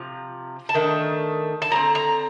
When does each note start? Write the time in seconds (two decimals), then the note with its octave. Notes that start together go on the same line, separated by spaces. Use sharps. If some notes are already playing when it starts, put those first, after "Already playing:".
Already playing: C3 F3
0.69 A5
0.74 D#3 A3 D4 G5
1.62 A5
1.70 D3 G3 A#5
1.76 C4
1.95 A#5